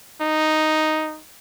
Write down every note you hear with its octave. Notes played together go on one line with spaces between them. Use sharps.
D#4